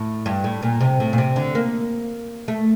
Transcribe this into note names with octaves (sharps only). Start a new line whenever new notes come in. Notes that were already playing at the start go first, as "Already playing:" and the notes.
Already playing: A2
G2
A2
A#2
C3
A2
A#2
C3
D3
A#3
A3